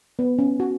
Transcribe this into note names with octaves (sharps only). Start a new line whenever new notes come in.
B3
C#4
F#4